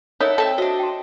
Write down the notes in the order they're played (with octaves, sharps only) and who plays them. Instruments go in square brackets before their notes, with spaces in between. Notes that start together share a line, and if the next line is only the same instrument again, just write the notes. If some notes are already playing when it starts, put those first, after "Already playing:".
[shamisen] D#4 [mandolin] E4 A4 F#5 [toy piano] A#4 C#5
[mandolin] C4 E5 E6 [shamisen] A4
[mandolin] D4 D#5 [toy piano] F#4 C5
[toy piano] G5 C6